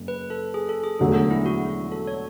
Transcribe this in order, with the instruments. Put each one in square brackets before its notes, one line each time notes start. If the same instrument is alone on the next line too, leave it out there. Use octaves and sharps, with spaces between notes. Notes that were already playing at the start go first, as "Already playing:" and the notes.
Already playing: [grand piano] F#1
[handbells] B4
A4
G#4
A4
G#4
[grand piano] E1 D2 D3 F#3 [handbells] G#4
[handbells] G#4
E4
F#4
A4
C#5